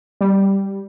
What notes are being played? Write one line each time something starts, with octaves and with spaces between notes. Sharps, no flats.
G3